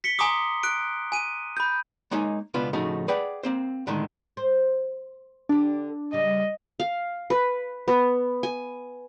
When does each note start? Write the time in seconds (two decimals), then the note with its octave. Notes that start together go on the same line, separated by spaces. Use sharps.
0.04 B6 C#7 G7
0.18 G#5 A#5 C6 D6 D#6 G7
0.63 F#6 D7
1.12 G#5 D#7
1.57 B5 G6
2.11 G#3 A#3 D#4 C#5 G#5
2.54 C#2 B2 B3 D4 F4
2.73 A2 C#3 F3 A3 D#4 F#4
3.08 G#4 B4 D5 F#5 G5
3.43 A#3 C4 C5
3.87 A2 D3 D#3 G#3
4.37 C5
5.49 D3 D4 G4
6.13 C#3 G3 D#5
6.80 F5
7.30 B4
7.88 B3
8.43 G#5